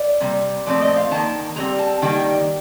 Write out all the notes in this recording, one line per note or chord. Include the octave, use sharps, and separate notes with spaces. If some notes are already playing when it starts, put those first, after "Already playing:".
Already playing: D5
C3 G3 A#3
A#2 F3 A3 C4 D5
D#5
F5
D#3 A#3 A5
A#2 G3 C4 A#5
A5
D#3 G3 A#3 G5